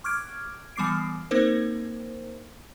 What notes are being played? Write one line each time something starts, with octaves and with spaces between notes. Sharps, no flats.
C#6 D6 F6 F#6 G#6 D7
E3 G3 B3 D6 C7 D7
A#3 C4 D#4 A#4 C5